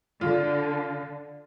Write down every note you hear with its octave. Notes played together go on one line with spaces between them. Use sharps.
D3 F4